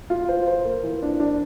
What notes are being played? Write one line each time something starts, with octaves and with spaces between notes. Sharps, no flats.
F4
C5
C5
A#3
E3
D4
D4